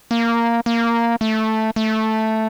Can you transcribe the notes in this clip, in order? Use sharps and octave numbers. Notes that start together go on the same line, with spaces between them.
A#3
A#3
A3
A3